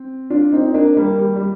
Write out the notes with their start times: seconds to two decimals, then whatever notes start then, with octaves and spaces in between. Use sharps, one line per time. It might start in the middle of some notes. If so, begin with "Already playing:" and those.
Already playing: C4
0.30 D4 F4
0.52 C4 D#4
0.66 D#4
0.74 A#3 D4
0.97 G3 A#3
1.19 G3
1.36 G3